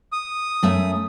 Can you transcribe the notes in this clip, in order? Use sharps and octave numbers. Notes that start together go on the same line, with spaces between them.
D#6
F#2 A3 E5